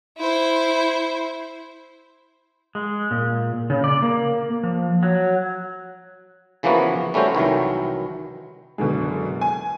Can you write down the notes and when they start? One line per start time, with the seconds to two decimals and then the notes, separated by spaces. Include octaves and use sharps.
0.18 E4 C5
2.75 G#3
3.11 A#2
3.70 C#3
3.84 D5
4.02 A#3
4.63 F3
5.03 F#3
6.63 C#3 E3 F3 A#3 B3 F#4
7.14 G3 A3 C#4 F#4 C5
7.35 C2 D#3 E3 F#3
8.78 F#1 B2 D3 G#3
9.41 G#5